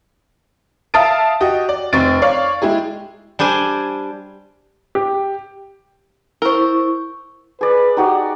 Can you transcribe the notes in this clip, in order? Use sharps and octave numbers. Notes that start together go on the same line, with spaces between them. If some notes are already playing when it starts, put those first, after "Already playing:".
E5 F5 A5 D#6 A6 D7
F#4 G4 D#5
D5
F1 C4 C#6 A6 D7
C#5 D5 F5 C#6
G#3 E4 G4 G#4
G3 D4 C5 G#5
G4
E4 A#4 C5 C#6
G#4 B4 D5
D#4 F#4 G4 D5